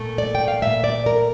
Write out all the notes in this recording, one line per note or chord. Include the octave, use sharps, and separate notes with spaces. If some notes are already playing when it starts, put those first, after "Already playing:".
Already playing: A#2 A3
D5
G5
F5
A#2 A3 E5
D5
A#4